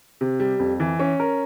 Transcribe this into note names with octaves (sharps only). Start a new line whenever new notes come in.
C3
G3
F2
E3
C#4
A#4